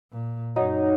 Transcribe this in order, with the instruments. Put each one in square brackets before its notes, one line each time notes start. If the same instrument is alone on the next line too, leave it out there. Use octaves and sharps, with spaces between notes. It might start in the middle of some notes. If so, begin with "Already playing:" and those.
[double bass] A#2
[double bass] F#2 [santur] F#3 [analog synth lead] D#4